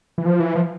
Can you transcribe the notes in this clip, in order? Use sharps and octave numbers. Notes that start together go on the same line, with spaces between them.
E3
F3
E3
F3